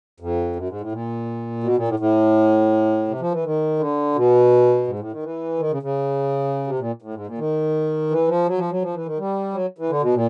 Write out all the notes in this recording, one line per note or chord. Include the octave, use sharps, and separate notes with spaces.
F2
F#2
G#2
A2
A#2
B2
A#2
A2
A2
C3
F3
E3
D#3
D3
B2
G#2
A2
D#3
E3
D#3
C#3
C#3
C3
A#2
A2
G#2
A#2
D#3
E3
F3
F#3
F3
F#3
F3
E3
D#3
G3
F#3
E3
D3
B2
A#2